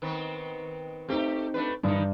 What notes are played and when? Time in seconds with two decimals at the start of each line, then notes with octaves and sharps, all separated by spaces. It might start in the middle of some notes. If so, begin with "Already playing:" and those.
0.02 D#3 B3 C4
1.09 A3 C4 D#4 G4
1.54 A3 D4 B4
1.83 G2 D3 E3 D#4